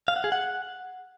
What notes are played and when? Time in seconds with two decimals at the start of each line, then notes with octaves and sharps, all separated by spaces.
0.08 F5
0.16 F#5
0.24 G#4
0.32 F#5